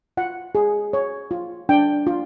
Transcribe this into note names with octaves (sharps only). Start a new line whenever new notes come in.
F4 F#5
G#4
C#5
F4
D4 G5
F4